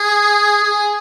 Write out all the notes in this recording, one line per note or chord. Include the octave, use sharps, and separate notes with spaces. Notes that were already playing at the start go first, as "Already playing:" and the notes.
Already playing: G#4
G#4